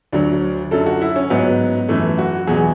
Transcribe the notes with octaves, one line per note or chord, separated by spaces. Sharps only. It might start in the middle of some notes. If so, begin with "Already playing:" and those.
D2 D3 F#3 D4
F#2 D3 F#3 A4
F#4
E4
C#4
G#2 F#3 B3
F#2 E3 A3
F#4
E2 B2 F#3 G#4